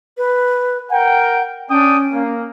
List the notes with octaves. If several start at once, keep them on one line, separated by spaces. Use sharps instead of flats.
B4
A#4 F#5 G5
C#4 D4 G5 D#6
A#3